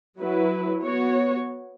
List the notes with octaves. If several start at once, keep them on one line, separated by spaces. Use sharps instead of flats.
F#3 E4 B4
B3 F#4 C#5